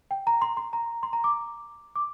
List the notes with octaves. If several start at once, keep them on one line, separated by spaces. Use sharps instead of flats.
G5
A#5
C6
C6
A#5
C6
A#5
D6
D6